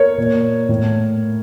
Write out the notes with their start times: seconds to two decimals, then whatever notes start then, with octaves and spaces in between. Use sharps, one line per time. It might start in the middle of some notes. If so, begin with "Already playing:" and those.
Already playing: A#4 C#5
0.18 A#2
0.69 A2